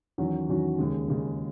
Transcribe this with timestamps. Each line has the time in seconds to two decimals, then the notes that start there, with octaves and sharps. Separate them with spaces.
0.18 E2 D#3 F#3 C#4 F#4
0.49 E2 D#3 F#3 C#4 F#4
0.78 D#2 C#3 G#3
1.08 D#2 C#3 G#3